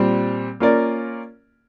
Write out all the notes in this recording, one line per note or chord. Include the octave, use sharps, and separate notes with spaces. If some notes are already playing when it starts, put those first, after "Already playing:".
Already playing: A#2 G3 C4
A#3 C#4 F4 A#4 D5